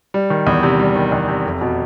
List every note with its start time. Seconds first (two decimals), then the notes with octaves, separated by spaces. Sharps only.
0.14 G3
0.30 D#3
0.47 E2
0.63 C3
0.80 G3
0.96 D#3
1.12 E2
1.29 C3
1.45 F1
1.61 B2